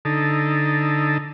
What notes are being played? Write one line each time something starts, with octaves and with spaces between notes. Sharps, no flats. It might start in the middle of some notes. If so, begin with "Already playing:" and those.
D3 D#4 A4